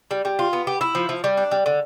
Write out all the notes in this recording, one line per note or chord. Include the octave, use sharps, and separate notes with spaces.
G3
G3
F4
B3
G4
E4
F3
F3
G3
D4
G3
D3